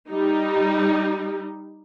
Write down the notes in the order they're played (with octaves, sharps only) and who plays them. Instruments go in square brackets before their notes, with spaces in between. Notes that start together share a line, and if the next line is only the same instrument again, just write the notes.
[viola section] G3 D#4